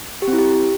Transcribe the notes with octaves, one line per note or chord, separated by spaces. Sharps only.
G4
C4
E4
G4